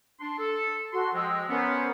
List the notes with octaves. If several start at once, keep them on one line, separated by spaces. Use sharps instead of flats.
D4 C6
A4
F#4 A4 C6
F3 G#3 D#5 G5 E6
B3 C#4 A#4 C5